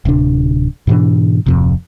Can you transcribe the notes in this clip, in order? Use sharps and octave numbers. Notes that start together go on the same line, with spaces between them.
D1 C3 D4
G#2 B2 E3 D4
D1 F2 C3